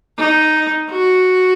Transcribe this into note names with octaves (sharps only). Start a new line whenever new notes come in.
D#4
F#4